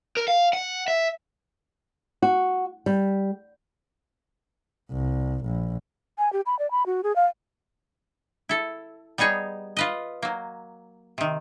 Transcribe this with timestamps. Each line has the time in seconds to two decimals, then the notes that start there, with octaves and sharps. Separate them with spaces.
0.17 A#4
0.28 F5
0.53 F#5
0.88 E5
2.22 F#4
2.86 G3
4.92 C2
5.45 A#1
6.18 G#5
6.33 G4
6.46 B5
6.59 D5
6.71 B5
6.86 F#4
7.04 G#4
7.16 F5
8.49 E4 A4
9.18 G3 B3 D#4 G#4 C#5
9.77 F4 B4 D#5
10.22 F#3 A#3
11.18 C3 D#3